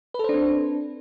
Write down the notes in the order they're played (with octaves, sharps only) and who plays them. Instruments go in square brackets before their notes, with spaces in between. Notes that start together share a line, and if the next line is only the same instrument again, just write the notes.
[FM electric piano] B4
A4
C5
D4
C4